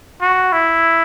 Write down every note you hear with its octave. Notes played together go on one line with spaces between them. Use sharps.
F#4
E4